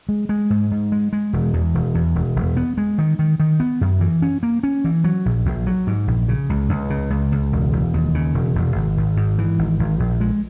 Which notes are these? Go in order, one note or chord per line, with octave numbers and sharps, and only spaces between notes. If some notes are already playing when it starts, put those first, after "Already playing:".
G#3
G#3
G#2
G#2
G#3
G#3
E1
E2
E1
E2
E1
E1
B3
G#3
D#3
D#3
D#3
B3
F#2
E3
C#4
A#3
C#4
E3
F#3
A#1
A#1
F#3
G#2
A#1
C#3
C#2
C#2
C#3
C#2
C#2
E1
E1
D#2
C#3
E1
E1
G#1
G#1
G#2
E3
G#1
G#1
A#1
G#3